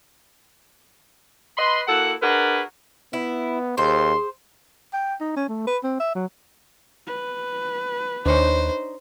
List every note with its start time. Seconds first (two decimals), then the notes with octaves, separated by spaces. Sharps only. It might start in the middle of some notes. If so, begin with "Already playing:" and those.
1.57 B4 D#5 B5 C6
1.87 A#3 E4 F#4 A4 F#5
2.21 D4 F#4 G#4 A#4 B4
3.13 B3 E4
3.78 D#2 G#4 C5 C6
4.94 G5
5.21 D#4
5.36 C#4
5.49 A3
5.68 B4
5.84 C4
6.00 E5
6.15 F#3
7.07 B4
8.26 D#2 D4 D#4 C5 C#5